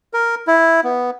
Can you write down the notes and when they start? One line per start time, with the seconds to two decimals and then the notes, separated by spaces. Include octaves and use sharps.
0.13 A#4
0.47 E4
0.84 B3